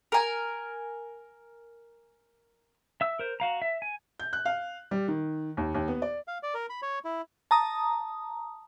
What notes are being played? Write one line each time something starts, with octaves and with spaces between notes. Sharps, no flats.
A#4 G#5
E5 E6
A#4 C5
F#4 F5 A#5
E5
G#5
G6
F#6
F5
G3
D#3
D#2
D#2
B3
D5
F5
D5
A#4
B5
C#5
E4
A5 A#5 D#6